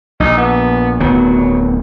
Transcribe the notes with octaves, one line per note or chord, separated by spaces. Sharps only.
A#1 D#4
B3
D1 D#3 F#3 B3